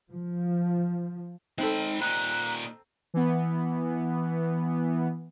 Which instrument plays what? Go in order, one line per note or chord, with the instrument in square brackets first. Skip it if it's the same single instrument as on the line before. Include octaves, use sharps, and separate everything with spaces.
[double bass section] F3
[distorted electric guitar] G#3 B5 [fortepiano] C4 A4 [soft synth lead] D#4
[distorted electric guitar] A#2 D#4 [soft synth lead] A#5 [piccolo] F#6
[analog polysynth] E3 B3